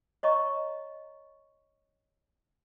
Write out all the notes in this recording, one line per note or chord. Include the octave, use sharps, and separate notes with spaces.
C#5 D#5 A#5 C#6